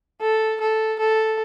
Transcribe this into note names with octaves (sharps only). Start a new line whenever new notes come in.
A4
A4
A4